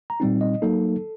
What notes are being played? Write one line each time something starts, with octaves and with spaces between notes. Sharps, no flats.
A#5
A#2 G3 C4 D#4
D#5
F#3 A#3 D#4 A4